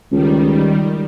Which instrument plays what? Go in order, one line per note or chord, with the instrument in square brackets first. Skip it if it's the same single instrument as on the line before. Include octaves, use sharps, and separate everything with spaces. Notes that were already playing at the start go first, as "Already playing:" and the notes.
[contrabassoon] C#2 [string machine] D#3 G3